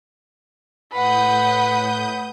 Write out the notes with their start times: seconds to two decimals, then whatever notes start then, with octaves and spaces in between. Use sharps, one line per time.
0.92 A2 B4 F#5 D#6 G6